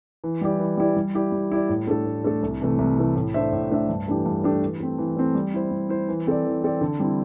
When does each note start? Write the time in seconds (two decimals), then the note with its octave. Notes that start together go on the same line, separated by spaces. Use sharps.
0.24 E3
0.41 G3 E4 G4 D5
0.59 E3
0.77 G3 E4 G4 D5
0.96 G3
1.15 E4 G4 D5
1.32 G3
1.51 E4 G4 D5
1.69 A2
1.87 A3 D4 A4
2.06 A2
2.24 A3 D4 A4
2.43 C2
2.61 C3 E3 A3
2.79 C2
2.98 C3 E3 A3
3.16 A2
3.34 A3 D4 C5 E5
3.53 A2
3.71 A3 D4 C5 E5
3.89 G2
4.08 E3 A3 D4 G4
4.26 G2
4.44 E3 A3 D4 G4
4.62 E3
4.80 A3 C4
4.98 E3
5.17 A3 C4
5.35 G3
5.54 E4 C5
5.71 G3
5.89 E4 C5
6.09 E3
6.27 C4 A4 D5
6.45 E3
6.64 C4 A4 D5
6.81 D3
6.99 G3 C4 E4